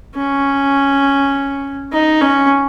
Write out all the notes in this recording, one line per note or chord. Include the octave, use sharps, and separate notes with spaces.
C#4
D#4
C#4